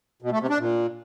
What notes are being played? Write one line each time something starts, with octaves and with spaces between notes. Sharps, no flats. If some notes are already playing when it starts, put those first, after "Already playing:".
B2
A3
C3
D4
A#2